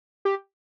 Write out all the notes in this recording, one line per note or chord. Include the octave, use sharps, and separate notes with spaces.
G4